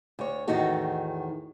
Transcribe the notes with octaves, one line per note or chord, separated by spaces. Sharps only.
D2 C#5
E2 A2 D#3 D#4 F#4 A4